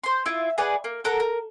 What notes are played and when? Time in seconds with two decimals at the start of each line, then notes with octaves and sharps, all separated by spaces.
0.03 C5 C6
0.26 E4 F4 E5
0.58 G#4 B4 D5 F#5
0.84 A#3
1.04 A4 A#4 F#5 A#5
1.20 A#4